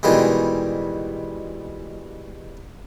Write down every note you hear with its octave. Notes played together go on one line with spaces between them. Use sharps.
B2 D#3 E3 G3 G#3